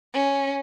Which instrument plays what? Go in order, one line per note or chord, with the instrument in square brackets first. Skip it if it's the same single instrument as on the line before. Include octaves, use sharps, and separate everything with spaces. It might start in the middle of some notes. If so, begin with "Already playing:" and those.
[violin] C#4